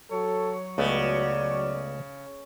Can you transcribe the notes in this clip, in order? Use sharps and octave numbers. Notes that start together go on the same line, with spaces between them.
F#3 A4 C#5
C#2 C#3 A3 B3 D5